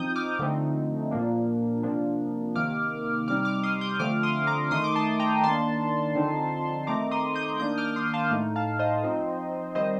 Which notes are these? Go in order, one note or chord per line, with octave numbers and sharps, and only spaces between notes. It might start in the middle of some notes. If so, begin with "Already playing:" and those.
Already playing: F3 C4 D#4 D#6 G6
D6 F6
D3 F3 A3 C4 D#4
A#2 F3 A#3 D4
C3 F3 A#3 D4
C3 D#3 A#3 D6 F6
C3 G3 C4 D#4 D6 F6
D6 F6
C6 D#6
D#6 G6
D3 F3 A3 C4 D6 F6
C6 D#6
A#5 D6
D#3 A3 D#4 C6 D#6
D6
A5 C6
G5 A#5
D#3 A#3 D4 A5 C6
D3 F3 C4 D#4
D#3 A3 C4 D#4 A#5 D6
C6 D#6
D#6 G6
D#3 A#3 D4 D#6 G6
D6 F6
C6 D#6
F5 A5
A2 A3 D#4
F5 A5
C5 D#5
F3 C4 D#4
D#3 G3 C4 C5 D#5